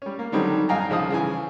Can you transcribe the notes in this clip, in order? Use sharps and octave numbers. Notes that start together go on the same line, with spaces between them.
G3 C#4
A#3
D3 D#3 F#3 G3 C4 D#4
G2 D#4 F5 G5 G#5 A#5
C2 C#3 F3 D#4 D#6
C#3 E3 G#5